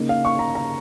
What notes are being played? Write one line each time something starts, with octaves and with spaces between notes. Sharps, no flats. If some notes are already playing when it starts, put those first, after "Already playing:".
Already playing: C#3 A#3 D#4
F5
C#6
A#5
A#5